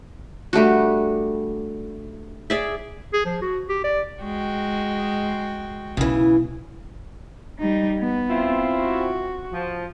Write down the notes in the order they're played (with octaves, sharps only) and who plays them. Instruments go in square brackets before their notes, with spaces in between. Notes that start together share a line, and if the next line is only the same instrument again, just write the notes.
[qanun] G3 A3 D4 F#4
G#4 D5 E5
[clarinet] G#4
F3
F#4
G4
D5
[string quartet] G#3 F#4 G5
[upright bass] B1 [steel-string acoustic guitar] C#3 E3
[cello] G3 D#4
B3
[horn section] C4 E4 F4
[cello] F#4
[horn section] F3